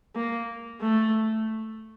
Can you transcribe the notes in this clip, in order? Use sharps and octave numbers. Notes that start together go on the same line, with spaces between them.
A#3
A3